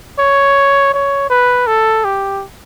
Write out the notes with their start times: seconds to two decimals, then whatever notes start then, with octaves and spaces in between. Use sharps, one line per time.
0.19 C#5
0.94 C#5
1.30 B4
1.67 A4
2.05 G4